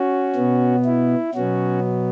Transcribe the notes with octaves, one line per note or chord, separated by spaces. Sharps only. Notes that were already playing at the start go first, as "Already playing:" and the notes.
Already playing: C#4 F#4
B2 B3
E4
B2 F#3 B3 C#4 F#4